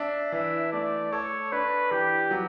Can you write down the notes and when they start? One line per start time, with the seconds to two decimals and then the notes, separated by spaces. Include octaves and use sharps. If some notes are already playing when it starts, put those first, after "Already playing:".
Already playing: D4 E5
0.32 E3 E5
0.72 A3 D5
1.13 A4 C#5
1.52 D4 B4
1.91 E3 G4
2.31 F#3